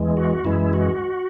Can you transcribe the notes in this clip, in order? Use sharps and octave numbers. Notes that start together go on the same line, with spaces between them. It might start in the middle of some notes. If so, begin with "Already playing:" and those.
Already playing: E2 E3 G#3
F#4
F#2 E3 G#3 E4
F#4